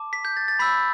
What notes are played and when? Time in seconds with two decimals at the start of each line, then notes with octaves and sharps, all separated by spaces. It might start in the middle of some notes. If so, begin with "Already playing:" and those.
Already playing: A5 D6
0.13 B6
0.25 G6
0.37 A6
0.48 A6
0.59 B5 E6 G6 B6